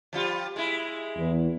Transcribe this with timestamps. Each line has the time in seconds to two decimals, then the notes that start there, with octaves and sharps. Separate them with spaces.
0.13 F3 G3 F4
0.56 G#3 E4
1.17 E2